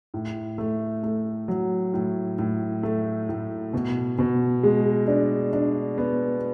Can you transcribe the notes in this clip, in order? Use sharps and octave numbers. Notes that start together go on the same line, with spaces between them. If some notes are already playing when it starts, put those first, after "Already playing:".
A2
A3
A3
F#3
A2
A2
A3
A2
B2
B2
G#3
D4
D4
B3